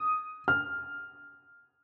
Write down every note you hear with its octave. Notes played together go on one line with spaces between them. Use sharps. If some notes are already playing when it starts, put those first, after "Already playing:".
Already playing: D#6
F6